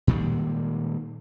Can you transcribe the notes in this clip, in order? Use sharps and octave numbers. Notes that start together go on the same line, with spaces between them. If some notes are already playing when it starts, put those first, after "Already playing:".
A#2 D#3 G3 G#3